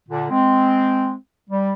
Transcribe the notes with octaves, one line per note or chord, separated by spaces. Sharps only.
A#2 D3
G#3 C4
G3